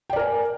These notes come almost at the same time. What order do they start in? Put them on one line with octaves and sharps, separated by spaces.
G5 D5 A#4 G#5